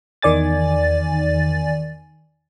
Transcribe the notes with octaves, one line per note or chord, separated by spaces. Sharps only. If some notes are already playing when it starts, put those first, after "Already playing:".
E2 D#3 D5 G#5 A6